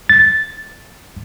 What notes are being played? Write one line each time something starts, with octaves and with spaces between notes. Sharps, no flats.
A6